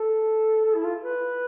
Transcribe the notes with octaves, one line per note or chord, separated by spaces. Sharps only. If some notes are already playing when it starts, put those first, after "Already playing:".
Already playing: A4
A4
E4
F4
B4